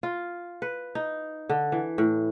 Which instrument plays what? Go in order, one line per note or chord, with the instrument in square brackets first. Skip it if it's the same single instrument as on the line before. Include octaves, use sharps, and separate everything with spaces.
[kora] F4
B4
D#4
D3
E3
A2